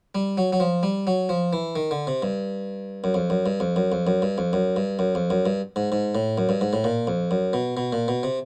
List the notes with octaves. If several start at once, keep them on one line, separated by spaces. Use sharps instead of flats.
G3
F#3
F#3
F3
G3
F#3
F3
E3
D#3
D3
C3
G2
F#2
F2
F#2
G2
F2
F#2
F2
F#2
G2
F2
F#2
G2
F#2
F2
F#2
G2
G#2
G#2
A2
F#2
G2
G#2
A2
A#2
F2
F#2
B2
B2
A#2
B2
C3